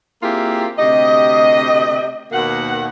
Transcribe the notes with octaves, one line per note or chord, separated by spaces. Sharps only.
A#3 C4 E4 F4 G4 G#4
D2 C3 G4 D#5
D#2 B2 D#3 A#3 F#5